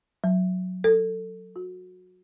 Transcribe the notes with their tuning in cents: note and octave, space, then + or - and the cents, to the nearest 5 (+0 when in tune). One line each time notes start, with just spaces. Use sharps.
F#3 -10
A4 +20
F#4 -25